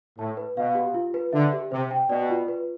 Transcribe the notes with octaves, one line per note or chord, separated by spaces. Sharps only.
A2 A5
B4
B2 F5
G4
F4
B4
D3 E5
G4
C3 C5
G5
B2 D5
F4
B4